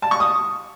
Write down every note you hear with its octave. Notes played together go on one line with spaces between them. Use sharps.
A5
C#6
D#6